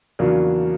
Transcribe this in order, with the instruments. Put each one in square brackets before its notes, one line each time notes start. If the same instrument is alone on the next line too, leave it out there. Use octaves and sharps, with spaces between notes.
[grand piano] E2 C#3 F3 A#3 D4 [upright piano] F#3